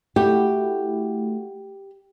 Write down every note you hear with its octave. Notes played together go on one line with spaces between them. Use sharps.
A3 E4 F#4 G4